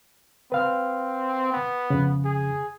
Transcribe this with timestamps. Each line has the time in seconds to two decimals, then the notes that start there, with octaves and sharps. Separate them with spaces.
0.52 C4 B4 F5 F6
1.53 B3
1.90 F2 C#3
2.25 G#4